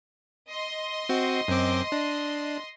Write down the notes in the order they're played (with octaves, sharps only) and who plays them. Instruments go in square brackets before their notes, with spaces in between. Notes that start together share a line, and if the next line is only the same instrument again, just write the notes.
[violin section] D#5 C6
[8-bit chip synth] C4 F#4
F#2 C4 D6
D4